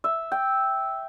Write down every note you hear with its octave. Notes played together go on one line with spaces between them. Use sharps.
E5
G5